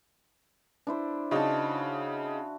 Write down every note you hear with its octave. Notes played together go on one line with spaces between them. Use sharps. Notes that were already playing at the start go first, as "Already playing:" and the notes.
D4 E4 C5
C#3 D#4 F#4 A5